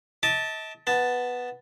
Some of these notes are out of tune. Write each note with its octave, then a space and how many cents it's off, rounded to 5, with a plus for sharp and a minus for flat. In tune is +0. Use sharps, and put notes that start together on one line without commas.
D#5 +45 A5 +0 D6 +0
B3 +0 A5 +0